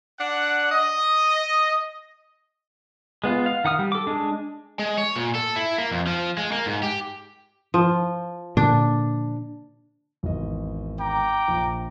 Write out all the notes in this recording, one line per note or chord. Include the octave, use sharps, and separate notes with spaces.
D4 F#5
D#5
G#3 B3 F4
F5
D#3 F#5 D#6 F6
G3
A4 D6
G#3 D4
G#3
C#5
A#2
A4
E4
A#3
F2
F3
G#3
A#3
G#2
G4
F3
A#2 D3 D4
G#1 E2 D#5
G5 A#5 D6
A#1